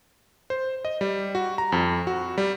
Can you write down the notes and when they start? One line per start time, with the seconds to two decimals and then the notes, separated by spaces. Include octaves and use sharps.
0.50 C5
0.85 D#5
1.01 G3
1.35 F#4
1.58 A#5
1.72 F2
2.07 F#4
2.38 G3